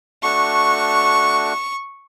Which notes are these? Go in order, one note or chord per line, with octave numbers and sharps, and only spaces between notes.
A3 D4 F#4 C#6